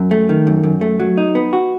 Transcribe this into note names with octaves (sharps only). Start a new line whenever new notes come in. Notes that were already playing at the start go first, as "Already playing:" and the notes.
Already playing: F#2
A3
D#3
F#2
F#2
A3
F#3
D#4
B3
F#4